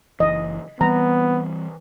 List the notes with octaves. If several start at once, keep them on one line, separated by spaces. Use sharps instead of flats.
F#1 C#2 E3 D#5
E3 G3 B3 C4 A#5